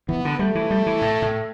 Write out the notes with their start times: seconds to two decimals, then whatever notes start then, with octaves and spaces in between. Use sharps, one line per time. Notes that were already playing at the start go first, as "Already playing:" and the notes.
0.09 E3 B3
0.25 D3
0.39 G3 A3
0.55 E3
0.71 G3
0.86 E3
1.02 A2
1.22 A2